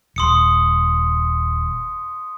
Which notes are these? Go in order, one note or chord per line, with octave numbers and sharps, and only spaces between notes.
D#1 C6 D#6 C#7